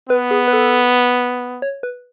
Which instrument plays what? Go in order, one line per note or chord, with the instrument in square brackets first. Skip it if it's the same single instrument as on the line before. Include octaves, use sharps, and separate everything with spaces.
[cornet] B3 [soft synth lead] B4
[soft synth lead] G#4
B4
A4
C#5
B4